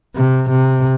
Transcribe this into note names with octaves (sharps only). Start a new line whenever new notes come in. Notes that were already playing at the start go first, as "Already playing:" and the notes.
C3
C3